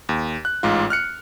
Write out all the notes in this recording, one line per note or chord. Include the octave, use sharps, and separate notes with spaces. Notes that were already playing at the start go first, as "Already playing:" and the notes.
D#2
F#6
A1 G#2 F4
F6 F#6 C#7